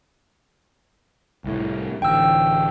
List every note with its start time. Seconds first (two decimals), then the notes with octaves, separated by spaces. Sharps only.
1.44 C2 A2
2.02 A1 D2 G5 E6